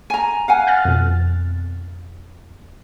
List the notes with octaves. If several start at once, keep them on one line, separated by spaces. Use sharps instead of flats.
G#5 A#5
F5 F#5 G#5
F6 F#6 A6
F2 B2